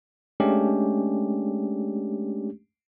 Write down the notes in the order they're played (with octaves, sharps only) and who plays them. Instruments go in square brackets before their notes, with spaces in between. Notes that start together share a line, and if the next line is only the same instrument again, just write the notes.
[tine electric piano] G#3 A3 C#4 D4 G4